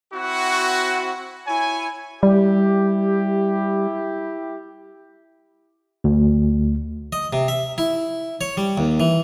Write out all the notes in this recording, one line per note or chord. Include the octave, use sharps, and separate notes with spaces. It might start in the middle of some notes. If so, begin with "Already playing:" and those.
C4 E4 F#4
E4 C#5 G#5
G3 E4 G4
D2
D#5
C3
E5
E4
C#5
G3
D#2
E3